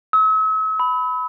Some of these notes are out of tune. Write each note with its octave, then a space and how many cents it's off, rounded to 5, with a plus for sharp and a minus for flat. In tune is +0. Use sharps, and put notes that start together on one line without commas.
E6 -45
B5 +15